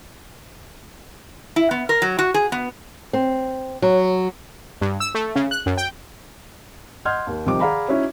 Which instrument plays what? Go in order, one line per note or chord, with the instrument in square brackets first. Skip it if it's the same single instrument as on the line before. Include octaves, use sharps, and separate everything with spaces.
[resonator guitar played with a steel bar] E4
B3
A#4
F#3
F#4
G#4
B3
[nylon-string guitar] C4
F#3
[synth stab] G2
E6
A3
C#3
F#6
F#2
G5
[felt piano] D#5 F#5 C6 F6 G6 G#6
D#2
C2 C3 D#3 F3 G5 D6
G#4 D5 F5 F#5 A#5 B5
C#4 D#4 E4 F#4 C#5